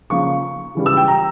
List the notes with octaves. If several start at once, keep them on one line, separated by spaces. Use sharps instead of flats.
C#3 F3 A#3 C#6
C#3 E3 G3
E6
G5
A#5